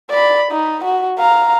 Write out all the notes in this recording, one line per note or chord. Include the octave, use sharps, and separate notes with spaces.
D5 B5
D#4
F#4
F5 A#5